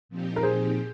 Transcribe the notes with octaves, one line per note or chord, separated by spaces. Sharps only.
A#2 F3 C4 D#4 G4
A#4
G#4 C5